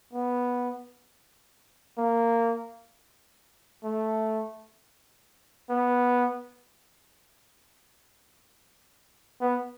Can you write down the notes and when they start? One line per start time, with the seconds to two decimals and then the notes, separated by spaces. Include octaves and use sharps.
0.14 B3
1.98 A#3
3.84 A3
5.70 B3
9.41 B3